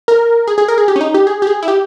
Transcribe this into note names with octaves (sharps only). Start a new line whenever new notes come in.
A#4
G#4
G#4
A#4
G#4
G4
C#4
D#4
G4
G#4
G4
G#4
E4
G4